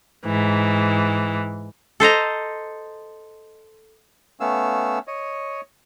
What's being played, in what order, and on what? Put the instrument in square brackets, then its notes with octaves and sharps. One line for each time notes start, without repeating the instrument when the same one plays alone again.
[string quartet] G#2 E3
[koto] A4 C5 D#5 A#5
[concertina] A3 B3 C#4 F5 E6
C#5 D#5